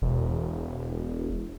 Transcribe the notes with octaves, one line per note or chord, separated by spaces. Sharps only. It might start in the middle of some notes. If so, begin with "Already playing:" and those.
E1